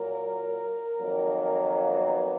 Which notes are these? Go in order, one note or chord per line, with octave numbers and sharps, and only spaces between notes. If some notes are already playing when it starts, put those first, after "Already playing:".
Already playing: A#2 F#3 A#3 A#4
F2 D#3 F#3 A#3
B3